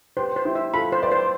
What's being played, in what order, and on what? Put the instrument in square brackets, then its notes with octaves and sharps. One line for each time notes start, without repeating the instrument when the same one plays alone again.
[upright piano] G4 B4 [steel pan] C5
[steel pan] C5
[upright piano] E4 G4
[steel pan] E5
[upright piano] F4 A4 [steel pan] B5
[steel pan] C5
[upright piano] B4 D5
[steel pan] C5